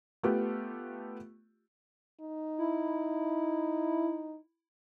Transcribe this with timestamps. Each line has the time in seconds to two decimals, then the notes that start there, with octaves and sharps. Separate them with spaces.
0.23 A3 B3 F4 G4
2.21 D#4
2.58 E4